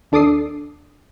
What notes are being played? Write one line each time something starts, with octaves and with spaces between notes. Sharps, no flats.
D#2 D4 A4 D6 D#6 C7